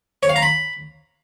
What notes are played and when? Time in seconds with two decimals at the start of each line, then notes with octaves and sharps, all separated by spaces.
0.23 C#5
0.29 F5
0.36 A#5
0.42 B5